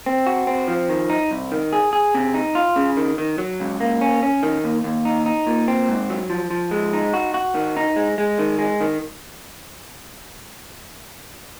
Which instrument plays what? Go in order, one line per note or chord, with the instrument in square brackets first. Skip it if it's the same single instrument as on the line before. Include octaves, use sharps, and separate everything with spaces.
[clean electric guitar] C4
F#4
C4
F3
D#3
D#4
C2
D#3
G#4
G#4
C3
D#4
F4
C#3
D#3
D#3
F#3
C#2
A#3
C#4
C#4
D#3
D#2
D#2
D#4
D#4
A#2
C4
G#2
F#3
F3
F3
G#3
D#4
F#4
F#4
D#3
D#4
G#3
G#3
D#3
G#3
D#3